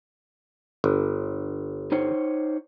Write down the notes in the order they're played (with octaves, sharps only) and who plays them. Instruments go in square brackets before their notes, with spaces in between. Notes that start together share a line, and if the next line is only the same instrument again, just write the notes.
[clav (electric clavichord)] G1
[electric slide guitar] D#4 C5 C#5